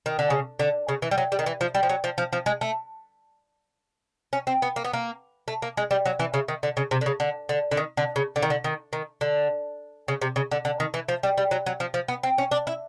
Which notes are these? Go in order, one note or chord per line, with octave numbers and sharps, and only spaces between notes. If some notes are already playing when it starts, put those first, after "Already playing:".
D#3
D3
C#3
D3
C#3
E3
G3
F#3
G3
D#3
E3
F3
G3
F3
F#3
F3
F3
F3
G#3
A3
C#4
C4
B3
A#3
B3
A#3
A3
A#3
G#3
G3
F#3
E3
C#3
D#3
D3
C#3
C3
D3
C#3
D3
D3
D3
D#3
D3
C#3
D3
D#3
D3
D#3
D#3
D3
C#3
C3
C#3
D3
D3
D#3
E3
F3
G3
G3
F#3
F#3
F3
F3
B3
C4
C#4
D4
E4